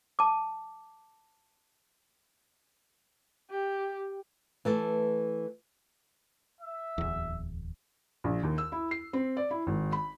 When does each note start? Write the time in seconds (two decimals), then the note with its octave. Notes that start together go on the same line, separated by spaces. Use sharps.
0.19 A5 D6
3.51 G4
4.65 E3 A3 A4
6.61 E5
6.98 D1 E2
8.24 A#1
8.43 D#2
8.58 E6
8.72 E4
8.91 C7
9.13 C4
9.37 D5
9.51 E4
9.67 G#1
9.92 B5